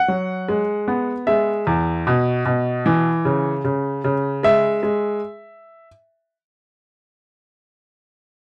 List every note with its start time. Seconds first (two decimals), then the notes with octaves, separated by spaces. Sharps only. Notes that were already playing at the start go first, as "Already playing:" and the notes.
Already playing: F#5
0.08 F#3
0.48 G#3
0.88 B3
1.27 G#3 E5
1.67 E2
2.07 B2
2.45 B2
2.86 E3
3.25 C#3
3.64 C#3
4.04 C#3
4.43 G#3 E5
4.83 G#3